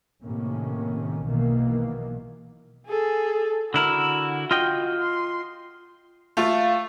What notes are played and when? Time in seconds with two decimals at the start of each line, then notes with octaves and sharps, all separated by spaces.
0.23 A2 C3 D#3 A#3 C#4
1.26 B1 B2 D#3 E3 A#3
2.87 G#4 A4
3.74 D3 E4 F#4 A#4
4.51 F4 D#5 G5
5.00 C6
6.37 A3 F4 F5